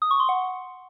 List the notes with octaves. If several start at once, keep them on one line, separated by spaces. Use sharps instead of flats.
D#6
C#6
C6
F#5